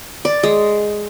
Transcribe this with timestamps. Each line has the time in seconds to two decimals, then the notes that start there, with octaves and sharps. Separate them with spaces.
0.25 D5
0.43 G#3